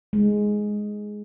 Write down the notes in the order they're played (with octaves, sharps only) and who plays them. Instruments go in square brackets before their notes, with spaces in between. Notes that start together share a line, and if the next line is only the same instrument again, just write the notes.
[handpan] G#3